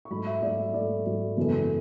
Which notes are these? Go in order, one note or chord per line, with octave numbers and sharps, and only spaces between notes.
C#6
G#2 F#3 A3 B5
E5
G#2 F#3 A3 D5
E5
G#2 F#3 A3 D5
G#2 F#3 A3
F#2 C#3 E3 G#3 B3 A4